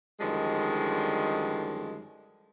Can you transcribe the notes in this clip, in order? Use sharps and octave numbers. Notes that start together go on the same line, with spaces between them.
F#2 D3 D#3 F3 G3 G#3